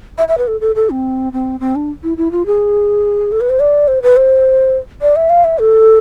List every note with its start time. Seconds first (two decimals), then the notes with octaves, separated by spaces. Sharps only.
0.18 E5
0.28 E5
0.38 B4
0.47 A4
0.61 A4
0.75 A4
0.90 C4
1.33 C4
1.60 C4
1.75 D4
2.03 E4
2.17 E4
2.31 F4
2.46 G#4
3.32 A4
3.41 B4
3.50 C5
3.60 D5
3.88 C5
4.02 B4
4.17 C5
5.02 D5
5.16 E5
5.30 F5
5.44 E5
5.59 A4